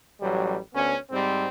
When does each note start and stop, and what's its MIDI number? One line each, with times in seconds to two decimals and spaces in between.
0.21 0.57 33
0.21 0.57 54
0.21 0.57 55
0.73 0.96 38
0.73 0.96 59
0.73 0.96 61
1.10 1.48 44
1.10 1.48 55
1.10 1.48 60